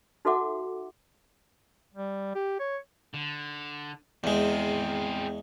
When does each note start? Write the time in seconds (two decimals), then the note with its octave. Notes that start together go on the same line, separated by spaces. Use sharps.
0.25 D#4 F#4 A4 E5 F#5 D6
1.94 G3
2.35 G4
2.60 C#5
3.14 D3
4.24 E2 G#3 C4 G#4